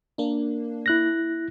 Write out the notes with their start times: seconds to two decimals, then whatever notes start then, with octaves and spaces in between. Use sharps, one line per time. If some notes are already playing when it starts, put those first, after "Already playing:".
0.18 A#3 D4
0.86 E4 F#6 A#6